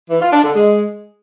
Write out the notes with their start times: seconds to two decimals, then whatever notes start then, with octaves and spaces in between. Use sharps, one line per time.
0.10 E3
0.21 F4
0.32 D4
0.44 D3
0.55 G#3